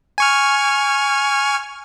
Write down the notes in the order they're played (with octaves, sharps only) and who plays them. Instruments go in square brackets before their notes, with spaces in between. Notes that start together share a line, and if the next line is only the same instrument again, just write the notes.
[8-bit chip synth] G#5 C#6 F6